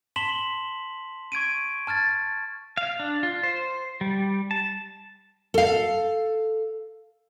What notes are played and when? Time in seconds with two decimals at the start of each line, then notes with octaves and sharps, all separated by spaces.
0.16 A5 C6 B6 E7 F#7 G7
1.32 C#6 G#6 D7 D#7
1.87 A5 F6 G#6 A6
2.77 F5
3.00 D4
3.23 F4
3.43 C5
4.01 G3
4.51 A5
5.54 A4 F5